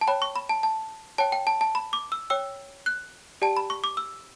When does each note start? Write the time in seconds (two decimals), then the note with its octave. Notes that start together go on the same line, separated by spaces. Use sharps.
0.01 A5
0.08 C#5 G5 B5
0.22 C#6
0.36 B5
0.49 A5
0.63 A5
1.18 C#5 G5 A5
1.32 G5
1.47 A5
1.61 A5
1.75 B5
1.93 D6
2.12 E6
2.30 C#5 G5 E6
2.86 F#6
3.42 G4 D5 G5 A5
3.57 B5
3.70 C#6
3.84 D6
3.97 E6